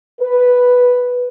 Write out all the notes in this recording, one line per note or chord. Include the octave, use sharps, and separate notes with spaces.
B4